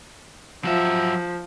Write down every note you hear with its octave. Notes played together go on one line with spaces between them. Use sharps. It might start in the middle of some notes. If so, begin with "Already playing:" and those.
F3 F#3 E5